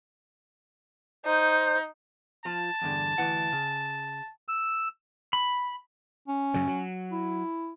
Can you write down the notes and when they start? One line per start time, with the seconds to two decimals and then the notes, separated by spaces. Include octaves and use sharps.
1.26 D#4 C5
2.45 F3 F4 A5
2.81 E2 G2 D3
3.18 D2 E3 F#5
3.52 C#3
4.48 E6
5.33 B5
6.28 C#4
6.54 F#2 C#3 F#3
6.67 F#3
7.12 E4